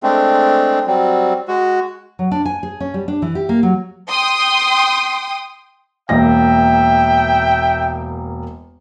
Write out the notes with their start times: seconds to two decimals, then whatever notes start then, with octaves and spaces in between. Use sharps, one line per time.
0.03 G#3 A3 C4 D4
0.87 F#3 G3 C4
1.48 G#3 F#4
2.19 F#3
2.31 D4
2.45 G#5
2.63 G#4
2.80 C#4
2.94 G3
3.08 D4
3.22 E3
3.35 G4
3.49 A#3
3.63 F#3
4.09 G5 C6 D#6
6.09 E1 A#3 E5 G5 A#6